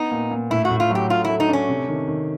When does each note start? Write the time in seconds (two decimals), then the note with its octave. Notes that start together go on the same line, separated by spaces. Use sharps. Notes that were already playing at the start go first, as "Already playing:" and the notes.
Already playing: B3 D#4
0.11 A#2
0.31 A#2
0.51 A2 E4
0.65 F#4
0.70 A2
0.80 F4
0.90 F#3 G4
1.10 A3 F4
1.25 A3 E4
1.40 D#4
1.49 C#4 D4
1.69 C3
1.89 D#3
2.08 D#3